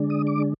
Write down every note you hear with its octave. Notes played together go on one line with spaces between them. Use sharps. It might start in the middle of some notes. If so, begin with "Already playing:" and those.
Already playing: D3 G#3 D4
D#6
D6